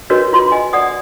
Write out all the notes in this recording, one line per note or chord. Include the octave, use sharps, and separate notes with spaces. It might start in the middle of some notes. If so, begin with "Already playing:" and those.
D4 F#4 A#4 B4 C#5 D#5
F4 C6
D#5 G#5
D5 F#5 D#6